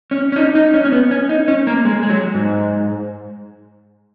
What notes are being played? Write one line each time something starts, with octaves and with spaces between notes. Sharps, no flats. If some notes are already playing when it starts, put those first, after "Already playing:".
C#4
C#4
D#4
D#4
C#4
C#4
B3
C#4
D#4
C#4
A#3
G#3
G#3
F#3
G#2